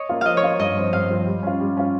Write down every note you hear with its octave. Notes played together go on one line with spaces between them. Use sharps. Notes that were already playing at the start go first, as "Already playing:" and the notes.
Already playing: C#5 D#5
A#3 F4
F3 D#5 F5
C#5
A#3 F4
G2 D#5
F3 C4
G2 F5
F3 C4
G3
C#4 F4
G3
C#4 F4